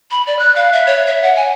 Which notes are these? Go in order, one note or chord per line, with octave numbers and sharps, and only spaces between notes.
B5
D5
F#6
F5
E5
C#5
E5
F#5
G#5